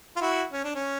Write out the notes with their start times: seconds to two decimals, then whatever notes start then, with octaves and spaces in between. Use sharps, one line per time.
0.16 F4
0.21 E4 F#4
0.52 C#4
0.64 D4
0.75 C#4